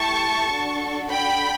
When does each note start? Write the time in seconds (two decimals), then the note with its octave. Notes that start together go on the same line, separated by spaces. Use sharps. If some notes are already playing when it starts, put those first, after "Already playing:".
Already playing: A3 E4 G4 A5 C#6
0.51 D4 F#4 A4
1.10 G5 B5